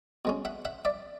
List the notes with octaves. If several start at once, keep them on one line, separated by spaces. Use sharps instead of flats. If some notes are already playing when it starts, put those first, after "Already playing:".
B2 G#3 C#4
E5 F#5
E5 F#5
D5 E5